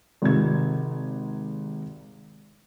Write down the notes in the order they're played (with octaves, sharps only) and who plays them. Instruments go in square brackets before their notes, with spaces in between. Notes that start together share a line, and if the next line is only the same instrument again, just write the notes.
[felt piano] G#1 C3 D#4 G#6